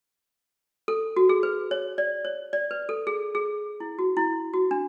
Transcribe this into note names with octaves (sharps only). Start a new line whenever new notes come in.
A4
F#4
G#4
B4
C#5
D5
C#5
D5
B4
A4
G#4
G#4
E4
F#4
E4
F#4
D4